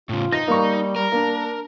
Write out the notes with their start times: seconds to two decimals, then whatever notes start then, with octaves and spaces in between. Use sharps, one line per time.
0.09 A2 C#3 F4
0.33 D#4 A#6
0.48 G3 A#3 C#6
0.96 G3 A#4
1.12 A#3 D4